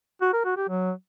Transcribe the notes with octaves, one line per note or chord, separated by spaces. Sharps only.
F#4
A#4
F#4
G4
F#3